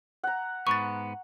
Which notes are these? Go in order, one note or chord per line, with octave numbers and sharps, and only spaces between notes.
F#5 A#5
G#2 B3 C#6 A6